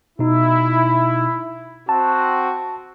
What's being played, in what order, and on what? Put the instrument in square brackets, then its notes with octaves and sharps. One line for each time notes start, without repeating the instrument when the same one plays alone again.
[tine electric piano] B2 D#4 [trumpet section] E4
[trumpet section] C4 F#4 [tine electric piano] A5